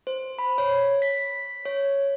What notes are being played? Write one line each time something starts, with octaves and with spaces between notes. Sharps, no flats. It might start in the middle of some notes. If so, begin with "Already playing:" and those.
C5
B5
C#5
B6
C#5